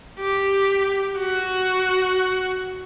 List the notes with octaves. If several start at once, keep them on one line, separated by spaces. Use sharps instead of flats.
G4
F#4